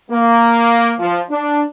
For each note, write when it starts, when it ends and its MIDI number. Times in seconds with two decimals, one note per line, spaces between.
0.11 0.93 58
0.99 1.21 53
1.30 1.62 62